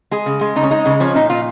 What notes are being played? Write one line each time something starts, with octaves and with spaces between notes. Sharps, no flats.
G#3 G#4
C#3
G#3
C#3 D#4
C#4
G#3 D#4
C#3
F3 C#4
A#2 D#4
A#2 F4